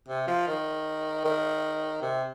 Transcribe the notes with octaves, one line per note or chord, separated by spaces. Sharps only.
C3
F3
D#3
D#3
C3